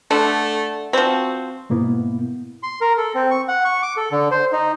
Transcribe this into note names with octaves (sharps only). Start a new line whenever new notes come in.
D3 A3
F3 C4 F#4
G#2 B2 A#3 B3 E4
C6
A#4
A4
C4
C#6
F#5
C#6
D6
A4
D3
C5
D#4